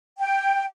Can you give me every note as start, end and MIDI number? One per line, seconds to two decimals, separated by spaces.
0.19 0.64 79